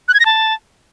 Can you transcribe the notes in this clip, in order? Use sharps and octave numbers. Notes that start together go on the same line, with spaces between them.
F#6
G#6
A#6
A5